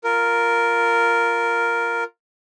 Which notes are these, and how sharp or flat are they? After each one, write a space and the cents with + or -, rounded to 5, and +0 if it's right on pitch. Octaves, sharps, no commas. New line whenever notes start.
F4 +0 A#4 +0